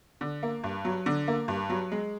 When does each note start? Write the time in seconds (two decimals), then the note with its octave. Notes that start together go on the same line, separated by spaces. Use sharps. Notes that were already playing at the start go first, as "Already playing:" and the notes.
0.21 D3
0.43 A#3
0.64 G2
0.85 F#3
1.06 D3
1.28 A#3
1.48 G2
1.70 F#3
1.92 G#3